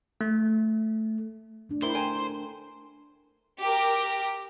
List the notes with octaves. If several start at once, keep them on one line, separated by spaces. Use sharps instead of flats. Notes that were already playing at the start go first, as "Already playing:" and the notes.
A3
A3 D4
G3 E4 A#4 C5
A4 G5 G#5 A#5
G4 A#4